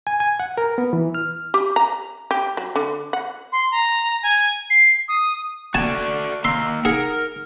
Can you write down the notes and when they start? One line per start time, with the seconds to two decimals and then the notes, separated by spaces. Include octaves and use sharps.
0.07 G#5
0.20 G#5
0.40 F#5
0.57 A#4
0.78 B3
0.93 E3
1.15 F6
1.54 G4
1.76 A#5
2.31 G4
2.57 F#3
2.76 D3
3.13 F#5
3.52 C6
3.72 A#5
4.23 G#5
4.70 C7
5.08 D#6
5.75 F#4 A4 D5 G#5 A5
6.44 D#3 A#3 C6 E6
6.85 D#4 G#4 A#4 F#5 C#7